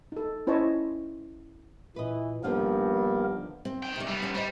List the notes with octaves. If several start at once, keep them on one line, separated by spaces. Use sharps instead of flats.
D#4 A4
C#4 E4 C5 C#5 D#5 A5
A#2 E3 B4 D#5
G2 D3 D#3 F3 A#3 B3 A#4
C4
D#3 G5
C3 D5
G3 B3
C#4 D4
G3 C5 D#5